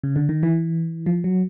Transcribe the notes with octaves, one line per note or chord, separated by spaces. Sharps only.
C#3
D3
D#3
E3
F3
F#3